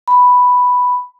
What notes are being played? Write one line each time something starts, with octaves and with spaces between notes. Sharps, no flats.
B5